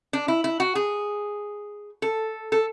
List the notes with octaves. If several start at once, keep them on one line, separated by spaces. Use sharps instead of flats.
D4
E4
E4
F#4
G#4
A4
A4